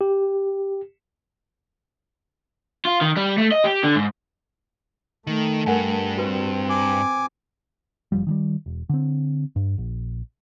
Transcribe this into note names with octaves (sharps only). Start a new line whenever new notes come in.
G4
F4
D#3
G3
A3
D#5
G4
D3
G#2
D#3 A3
G2 A#4 F#5 G#5
C4 F#4 B4
G#5 D6
F#1 F2 F3 G3
D#3 F3 G3
E1
D3 C4
G2
A#1